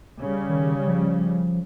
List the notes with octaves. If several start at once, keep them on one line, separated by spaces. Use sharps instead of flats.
C#3 G3
D#3
F3